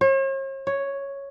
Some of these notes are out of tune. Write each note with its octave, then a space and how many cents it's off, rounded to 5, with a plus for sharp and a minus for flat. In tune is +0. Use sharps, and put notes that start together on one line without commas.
C#5 -45
C#5 +0